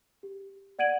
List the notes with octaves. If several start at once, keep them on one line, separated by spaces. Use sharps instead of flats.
G4
D5 F#5 G#6 D7 D#7 F#7